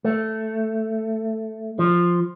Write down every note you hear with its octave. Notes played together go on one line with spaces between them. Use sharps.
A3
F3